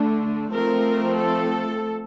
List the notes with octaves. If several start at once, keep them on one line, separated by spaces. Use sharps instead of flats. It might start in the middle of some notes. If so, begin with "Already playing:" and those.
Already playing: D3 A3 D4
F3 A3 C4 A#4
A4